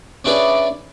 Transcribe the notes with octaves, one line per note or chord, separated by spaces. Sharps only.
C#4 D4 E4 G#4 B4 D5